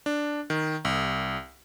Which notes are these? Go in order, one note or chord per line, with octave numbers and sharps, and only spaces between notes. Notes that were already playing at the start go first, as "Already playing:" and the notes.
D4
D#3
C2